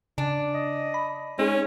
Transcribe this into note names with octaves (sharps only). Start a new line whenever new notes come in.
C#3 D4
D#5
B5
G#3 C#4 D#4 G#4